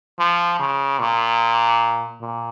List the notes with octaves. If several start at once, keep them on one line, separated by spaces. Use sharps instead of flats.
F3
C#3
A#2
A#2